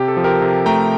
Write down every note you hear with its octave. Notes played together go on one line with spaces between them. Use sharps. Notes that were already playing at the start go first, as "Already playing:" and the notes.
Already playing: C3 G4
A4
F3
G4 A#4
C3
A3 G5 A#5